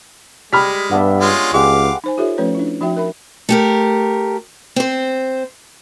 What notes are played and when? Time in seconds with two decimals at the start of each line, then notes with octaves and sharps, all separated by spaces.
0.53 G3 G#3 B5 F6 B6
0.91 G2 B3 D4 E5
1.21 G#3 C#4 F4
1.54 C#2 G#3 G4 F5 F#5 D6
2.04 D#4 C5 G#5
2.17 D#4 F4 G4 A4 C#5 E5
2.38 F3 A3 C#4 B4 C#5
2.55 D4 E4
2.80 F3 D#4 F#4 E5 G5
2.97 A#4 E5 B5
3.49 A3 G4 A#4
4.76 C4 C5